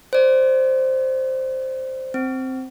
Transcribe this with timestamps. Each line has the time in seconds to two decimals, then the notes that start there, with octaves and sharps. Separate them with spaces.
0.13 C5 D5
2.14 C4